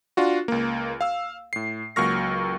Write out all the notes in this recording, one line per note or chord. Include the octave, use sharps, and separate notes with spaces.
D4 F4 F#4
C#2 A#3
F5 E6
A2 C7
C#2 F#3 A#3 C#6 F6 A#6